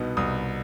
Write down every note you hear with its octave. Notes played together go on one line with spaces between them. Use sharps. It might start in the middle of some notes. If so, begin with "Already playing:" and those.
Already playing: C2 B2 B3 D#4
C2 D#6